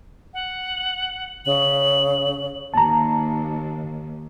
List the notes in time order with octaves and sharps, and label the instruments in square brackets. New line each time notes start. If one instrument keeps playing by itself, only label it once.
[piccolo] F#5
[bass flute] C#3 [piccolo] F#7
[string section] D#2 [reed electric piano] A5 A#5